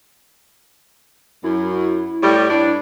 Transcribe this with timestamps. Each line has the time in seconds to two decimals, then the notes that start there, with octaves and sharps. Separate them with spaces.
1.44 F#2 E4
2.23 A2 G3
2.50 G2 D4 E4